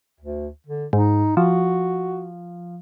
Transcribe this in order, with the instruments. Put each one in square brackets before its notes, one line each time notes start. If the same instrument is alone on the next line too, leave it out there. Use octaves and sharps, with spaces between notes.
[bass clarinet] D2
D3
[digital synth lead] G#2 [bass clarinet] D#4
[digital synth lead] F3 [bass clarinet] F#4